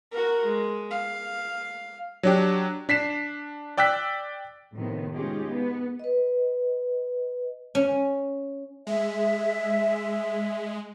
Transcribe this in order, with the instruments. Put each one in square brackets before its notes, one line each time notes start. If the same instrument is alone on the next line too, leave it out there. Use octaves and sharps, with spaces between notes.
[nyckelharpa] F#4 A#4
G#3
F5
[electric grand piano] F#3 D4 G4
D4 B6 C7 E7
D5 G5 E6 F#6 B6
[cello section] A2 C3 D#3 F3 B3
G#3 C#4 D#4 F4 G4 G#4
B3
[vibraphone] B4 D#5
[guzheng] C#4
[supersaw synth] G#3 [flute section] E5